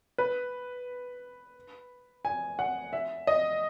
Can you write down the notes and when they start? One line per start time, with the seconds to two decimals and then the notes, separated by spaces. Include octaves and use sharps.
0.18 B4
2.25 G#5
2.59 F#5
2.93 E5
3.27 D#5